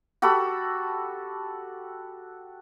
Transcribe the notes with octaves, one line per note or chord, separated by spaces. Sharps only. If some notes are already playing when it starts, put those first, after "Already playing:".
F#4 G4 A4 B5